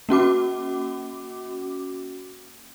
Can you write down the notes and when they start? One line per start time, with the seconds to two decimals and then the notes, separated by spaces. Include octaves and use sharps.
0.09 A#3 C#4 F#4 D6